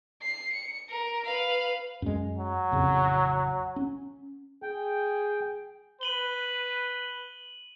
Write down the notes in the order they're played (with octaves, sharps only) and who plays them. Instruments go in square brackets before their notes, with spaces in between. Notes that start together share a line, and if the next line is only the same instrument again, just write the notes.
[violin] C7
C#7
A#4
B4 F5
[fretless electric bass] F#2 G#3
[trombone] F#3
[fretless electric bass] A1 F2 C#3
C#4
[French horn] G#4 [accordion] G5
[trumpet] B4 [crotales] D#7 F#7 G7